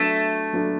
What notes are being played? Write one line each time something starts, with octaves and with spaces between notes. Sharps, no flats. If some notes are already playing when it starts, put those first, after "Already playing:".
Already playing: F#3 A3 B3 D4 A4
F#3 B3 D4 A4